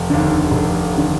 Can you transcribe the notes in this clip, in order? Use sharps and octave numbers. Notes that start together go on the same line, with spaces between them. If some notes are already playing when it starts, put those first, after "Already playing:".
Already playing: F1
D#2 D3
F1
D#2 D3